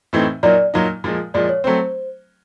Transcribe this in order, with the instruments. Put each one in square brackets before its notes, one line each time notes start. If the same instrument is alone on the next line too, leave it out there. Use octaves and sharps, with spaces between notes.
[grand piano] A2 E3 A3 C4 D#4
[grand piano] A#2 F#3 A#3 D#4 [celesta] D5
[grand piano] A#2 F#3 A#3 D#4
A#2 F3 G#3
[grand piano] A#2 F3 G#3 [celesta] D5
[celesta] C#5
[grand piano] F#3 A3 C4 [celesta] C5